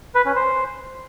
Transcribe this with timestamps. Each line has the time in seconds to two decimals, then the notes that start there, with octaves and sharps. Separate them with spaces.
0.15 B4
0.25 C#4
0.36 C5